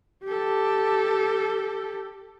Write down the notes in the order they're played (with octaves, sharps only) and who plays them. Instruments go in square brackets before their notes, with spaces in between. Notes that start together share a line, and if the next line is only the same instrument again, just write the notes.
[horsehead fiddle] G4 A4